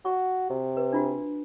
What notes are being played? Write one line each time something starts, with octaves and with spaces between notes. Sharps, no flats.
F#4 C#6
C3
B4
D4 F4 F#4